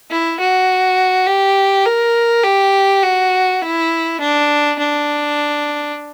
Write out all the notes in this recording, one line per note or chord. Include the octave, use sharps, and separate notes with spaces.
E4
F#4
G4
A#4
G4
F#4
E4
D4
D4